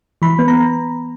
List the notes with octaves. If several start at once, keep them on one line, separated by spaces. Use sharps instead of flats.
E3 B5
B3
A#5